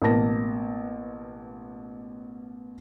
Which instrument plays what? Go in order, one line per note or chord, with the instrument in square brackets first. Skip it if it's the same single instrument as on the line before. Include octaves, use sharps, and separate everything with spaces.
[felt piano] A1 B2 A#3 A5 A#6